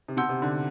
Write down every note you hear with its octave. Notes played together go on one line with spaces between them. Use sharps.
C3
B2 F#5 C6 E6 G6
C3
D3